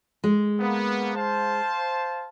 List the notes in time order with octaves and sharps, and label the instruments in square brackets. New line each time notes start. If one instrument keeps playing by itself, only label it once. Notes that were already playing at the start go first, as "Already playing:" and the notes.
[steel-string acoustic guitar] G#3
[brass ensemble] A#3 B3
C5 F5 A5